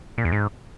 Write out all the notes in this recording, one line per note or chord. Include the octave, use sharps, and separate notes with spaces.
A#2
E2
G#2